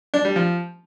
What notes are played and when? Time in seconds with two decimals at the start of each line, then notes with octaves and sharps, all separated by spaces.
0.14 D4
0.25 G3
0.36 F3